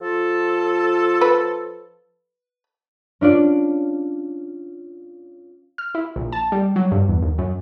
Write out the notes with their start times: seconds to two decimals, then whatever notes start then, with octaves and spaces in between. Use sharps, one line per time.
0.02 F3 F4 A4
1.21 B4
3.21 C#4 D4 F4 D5
5.78 F6
5.95 E4
6.16 A#1
6.33 A5
6.52 G3
6.76 F#3
6.92 G2
7.08 E2
7.22 D#2
7.38 F#2